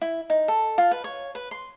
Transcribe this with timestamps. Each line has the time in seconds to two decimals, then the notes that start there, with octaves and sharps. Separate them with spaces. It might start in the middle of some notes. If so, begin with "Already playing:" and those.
0.02 E4
0.30 D#4
0.48 A4
0.78 F4
0.91 B4
1.04 C#5
1.35 B4
1.51 C6